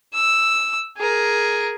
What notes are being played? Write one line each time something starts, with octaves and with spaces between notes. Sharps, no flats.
E6
G#4 A#4